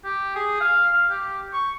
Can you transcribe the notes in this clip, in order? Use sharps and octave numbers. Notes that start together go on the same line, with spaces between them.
G4
G#4
F5
F5
G4
C#6